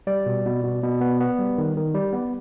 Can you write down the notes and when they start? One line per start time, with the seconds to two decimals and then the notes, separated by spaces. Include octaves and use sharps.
0.07 G3 D5
0.26 B2
0.46 B2
0.63 B2
0.83 B2
1.01 B3
1.20 B3
1.39 G3
1.58 D#3
1.77 D#3
1.94 G3
2.13 B3